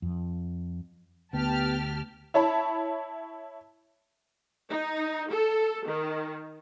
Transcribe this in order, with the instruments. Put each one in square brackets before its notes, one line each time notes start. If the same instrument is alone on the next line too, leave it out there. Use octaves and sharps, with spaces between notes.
[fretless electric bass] F2 F3
[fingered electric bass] D2 [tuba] B3 [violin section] G4 A5 F6
[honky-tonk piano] E4 C#5 A5 B5
[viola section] D#4
A4
D#3